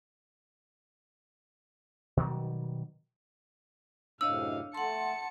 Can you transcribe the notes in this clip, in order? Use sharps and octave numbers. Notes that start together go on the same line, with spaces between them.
B2 D#3 F#3 G3
F#2 A2 C3 D4 C#5 D#5 F5 E6
A3 F#5 A5 C6 C#7